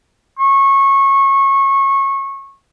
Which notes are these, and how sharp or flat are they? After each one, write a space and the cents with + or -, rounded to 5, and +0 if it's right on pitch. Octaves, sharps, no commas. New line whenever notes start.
C#6 -20